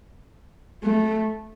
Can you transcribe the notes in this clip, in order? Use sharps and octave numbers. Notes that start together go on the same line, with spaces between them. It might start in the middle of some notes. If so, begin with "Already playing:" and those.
A3